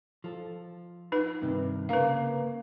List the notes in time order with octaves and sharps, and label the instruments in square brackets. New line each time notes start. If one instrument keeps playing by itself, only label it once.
[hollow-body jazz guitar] F3 A4
[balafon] D#4 B4
[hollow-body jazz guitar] G2 C3 D#3
[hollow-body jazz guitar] C#3 A#3 A#4 [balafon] B4 F5